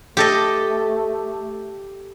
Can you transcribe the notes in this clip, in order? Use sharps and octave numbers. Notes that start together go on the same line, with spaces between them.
A3 G4 A4 D#5